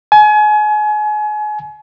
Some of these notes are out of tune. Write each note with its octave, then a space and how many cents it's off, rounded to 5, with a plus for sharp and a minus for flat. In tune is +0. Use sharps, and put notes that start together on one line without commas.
G#5 +30